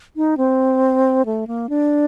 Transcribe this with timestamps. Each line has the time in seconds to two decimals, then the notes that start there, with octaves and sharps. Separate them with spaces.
0.16 D#4
0.37 C4
1.25 A3
1.47 A#3
1.69 D4